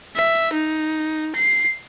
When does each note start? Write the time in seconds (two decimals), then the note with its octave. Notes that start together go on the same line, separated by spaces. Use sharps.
0.16 E5
0.53 D#4
1.35 C7